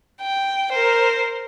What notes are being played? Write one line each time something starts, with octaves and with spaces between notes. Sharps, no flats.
G5
A#4 C5